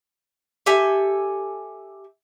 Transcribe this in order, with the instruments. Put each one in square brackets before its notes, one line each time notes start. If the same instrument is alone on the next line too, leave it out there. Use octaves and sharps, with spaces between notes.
[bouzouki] G4 A4 E5 G#5